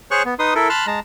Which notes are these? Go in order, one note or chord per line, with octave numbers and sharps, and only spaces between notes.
G#4 C5 C#5 C#6 F#6
B3
D#4 B4 C6 D#6
E4 A4 A#4
A5 B5 C6 F6 F#6
G#3 A5 A#5